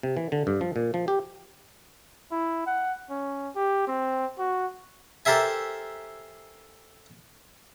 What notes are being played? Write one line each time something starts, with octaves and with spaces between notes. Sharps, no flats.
C3
E3
D3
G2
F3
A#2
F3
G4
E4
F#5
C#4
G4
C4
F#4
G4 A4 A#4 C5 E5 G#5